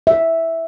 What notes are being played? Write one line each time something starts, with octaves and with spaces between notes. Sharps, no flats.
E5